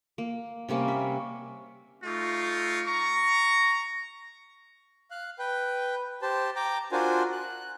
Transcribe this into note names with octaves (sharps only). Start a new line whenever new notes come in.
A#3
C3 G3 A#3 C#4
E5
A3 D#4 F4 C#6
A#5 C#6
F5 F#6
B4 G5
G4 C5 A5
G5 A#5 D6
D4 F4 F#4 A#4 C5 G#5
F#6